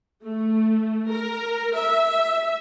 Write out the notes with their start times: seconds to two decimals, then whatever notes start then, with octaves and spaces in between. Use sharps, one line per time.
0.23 A3
1.10 A#4
1.75 E5